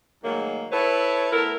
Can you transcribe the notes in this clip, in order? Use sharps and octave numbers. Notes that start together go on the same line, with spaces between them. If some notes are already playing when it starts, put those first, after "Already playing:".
G#2 D#3 F#3 A3 A#3
E4 A4 B4 C#5
A3 B3 E4 A#4